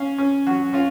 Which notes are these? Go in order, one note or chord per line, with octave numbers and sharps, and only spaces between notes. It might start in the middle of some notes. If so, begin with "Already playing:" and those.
Already playing: C#4 F5
C#4
F#3 F#4
C#4 F4